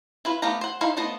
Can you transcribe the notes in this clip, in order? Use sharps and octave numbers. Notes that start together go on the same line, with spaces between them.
E4 F4 B4
A3 B3 G4 F5 A#5
C5 F#5
D#4 E4 C5 F5
A3 B3 F4 C5 D#5